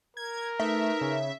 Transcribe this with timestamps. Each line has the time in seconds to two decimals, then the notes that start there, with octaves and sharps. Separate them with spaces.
0.17 A#4 G#6
0.60 A3 D#4 B4 E5
1.01 C#3